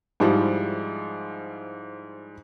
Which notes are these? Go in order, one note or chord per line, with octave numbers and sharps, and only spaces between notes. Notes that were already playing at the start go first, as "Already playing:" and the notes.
G#2 F3 G3 E4